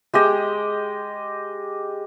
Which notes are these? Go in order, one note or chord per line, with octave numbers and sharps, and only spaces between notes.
G#3 G4 D#5